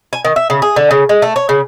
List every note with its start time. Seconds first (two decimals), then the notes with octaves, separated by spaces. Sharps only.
0.13 G#5
0.25 D#3
0.36 E5
0.50 C#3
0.62 G#4
0.76 D3
0.91 C#3
1.09 G#3
1.22 A3
1.36 C#5
1.49 C#3